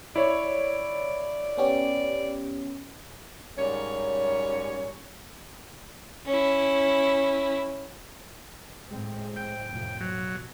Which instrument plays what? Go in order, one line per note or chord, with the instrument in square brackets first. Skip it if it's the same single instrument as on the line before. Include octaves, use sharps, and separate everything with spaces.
[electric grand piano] E4 C#5 [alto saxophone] D5
[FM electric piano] B3 C#4 G4
[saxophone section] G#2 G3 A#3 C#4 C#5
[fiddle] C#4 E4
[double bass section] A2 G#3 C4
[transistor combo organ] G5
[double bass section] F2 A2 C3
[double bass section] B2 [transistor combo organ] F#3